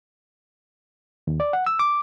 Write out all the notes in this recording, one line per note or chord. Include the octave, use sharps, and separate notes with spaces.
D#2
D5
F#5
E6
D6